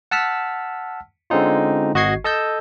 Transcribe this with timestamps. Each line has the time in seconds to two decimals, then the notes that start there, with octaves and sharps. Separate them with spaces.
0.11 F#5 A5 E6 F6 B6
1.30 D3 G#3 C4 C#4 D#4 F4
1.94 G#1 F#4 D#5 C#6 G#6 C7
2.24 A4 D#5 A5 E6 G6